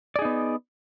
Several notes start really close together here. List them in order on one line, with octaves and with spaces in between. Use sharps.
D5 G#4 D#4 B3